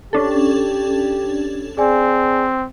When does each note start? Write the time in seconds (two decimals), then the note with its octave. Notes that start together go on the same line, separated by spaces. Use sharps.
0.13 C#4 D4 G4 A4
1.77 C4 G#4 D5 G#5